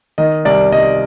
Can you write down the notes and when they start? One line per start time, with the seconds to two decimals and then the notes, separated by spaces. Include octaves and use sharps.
0.18 D#3 D#5
0.45 C2 D5
0.72 C2 D#5